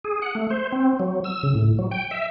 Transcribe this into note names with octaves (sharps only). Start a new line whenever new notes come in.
G#4
F#5
A3
C5
C4
F#3
E6
C#3
A2
F#3
G5
E5